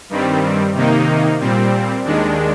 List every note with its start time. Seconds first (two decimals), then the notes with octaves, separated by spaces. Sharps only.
0.09 G2 D#3 G3 C4
0.74 C3 D#3 A#3 D#4
1.40 A#2 G3 C4
2.05 D#2 D#3 G#3 D4